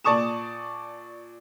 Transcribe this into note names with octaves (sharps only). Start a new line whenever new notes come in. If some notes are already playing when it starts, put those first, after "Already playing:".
A#2 D5 A5 C#6 D#6 E7